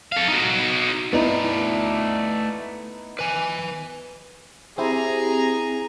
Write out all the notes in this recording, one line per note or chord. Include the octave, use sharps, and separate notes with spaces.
A4 F5
D#4 F#4
A3 B3 D#4 E4 D5 A#5
B4 G#5
C4 E4 G4 G#4 A#5